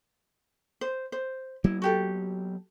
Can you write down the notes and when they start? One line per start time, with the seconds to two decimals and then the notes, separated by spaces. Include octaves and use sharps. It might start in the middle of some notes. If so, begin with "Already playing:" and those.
0.81 C5
1.12 C5
1.64 F#3 A#3 B3 E4
1.82 F#4 G4 A4